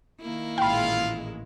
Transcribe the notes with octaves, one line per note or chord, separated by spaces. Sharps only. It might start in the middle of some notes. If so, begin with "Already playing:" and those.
D#3 A#3 E4
A1 A#2 G#3 F4 F5 G5 B5